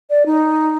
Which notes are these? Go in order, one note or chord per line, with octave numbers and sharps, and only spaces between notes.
D5
D#4